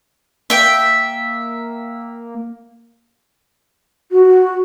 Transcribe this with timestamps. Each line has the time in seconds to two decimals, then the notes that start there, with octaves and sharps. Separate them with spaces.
0.50 A#3 E5 G5
4.12 F#4